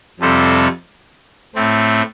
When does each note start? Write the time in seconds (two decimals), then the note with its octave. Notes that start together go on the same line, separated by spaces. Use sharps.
0.20 F2 C3 G3 C4 A4
1.55 A2 A3 C4